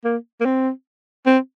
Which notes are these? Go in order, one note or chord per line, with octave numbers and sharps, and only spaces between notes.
A#3
A#3
C4
C4